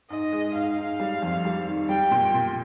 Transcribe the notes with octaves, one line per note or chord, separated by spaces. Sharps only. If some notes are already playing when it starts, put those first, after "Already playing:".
G#2 D#5
G#3
G#2 F5
G#2
G3
F2
G3
D#3
G3 G5
A#2
A#2